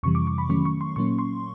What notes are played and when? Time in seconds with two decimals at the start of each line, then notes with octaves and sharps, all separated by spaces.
0.03 F2 C3 E3 G3 C#6
0.15 D6
0.27 C#6
0.38 B5
0.50 D#3 F#3 A3 C#4 C#6
0.65 C#6
0.81 C6
0.96 A#2 F#3 A#3 C#4 C#6
1.19 C6